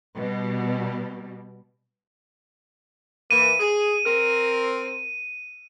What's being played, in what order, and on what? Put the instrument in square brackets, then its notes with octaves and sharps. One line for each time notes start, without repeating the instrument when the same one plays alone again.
[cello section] B2 G3
[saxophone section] E3 A#3 [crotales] D#7
[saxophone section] G#4
C4 A#4